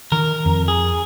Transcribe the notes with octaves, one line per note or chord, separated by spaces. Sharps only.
D#3 A#4
F2
G#4